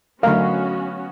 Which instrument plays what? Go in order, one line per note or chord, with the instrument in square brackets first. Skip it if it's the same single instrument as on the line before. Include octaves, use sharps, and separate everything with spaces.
[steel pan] D3 A3 A#4 [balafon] F#3 [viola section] B3 C#4 F#4 [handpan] F5